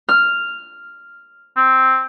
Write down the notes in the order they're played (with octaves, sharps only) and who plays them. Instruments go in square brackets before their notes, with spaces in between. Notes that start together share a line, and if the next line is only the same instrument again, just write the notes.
[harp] F6
[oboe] C4